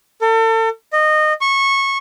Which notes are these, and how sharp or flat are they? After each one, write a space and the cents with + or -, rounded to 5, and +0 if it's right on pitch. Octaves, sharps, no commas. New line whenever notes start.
A4 +35
D#5 -20
C#6 -20